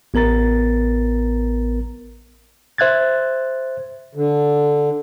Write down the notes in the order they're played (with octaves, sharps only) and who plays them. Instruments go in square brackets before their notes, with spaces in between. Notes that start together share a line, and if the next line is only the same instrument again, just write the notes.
[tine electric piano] A1 B3 A#4 A#5 A6
[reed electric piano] C5 E5 F#6 G#6 A6
[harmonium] D3